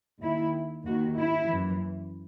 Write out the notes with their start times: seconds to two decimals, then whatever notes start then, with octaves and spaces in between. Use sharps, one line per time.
0.23 D#2 D#3 E4
0.86 D#2 D#3 F#4
1.18 E4
1.50 F#2 E3